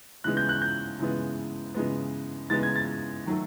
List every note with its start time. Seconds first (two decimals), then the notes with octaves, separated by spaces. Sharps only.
0.24 C#3 E3 G#3 B3 F#6
0.37 G6
0.49 F#6
0.62 G6
0.99 C#3 E3 G#3 B3
1.74 C#3 E3 G#3 B3
2.50 C#3 E3 G#3 B3 A6
2.63 G#6
2.76 A6
3.26 D#3 F#3 A3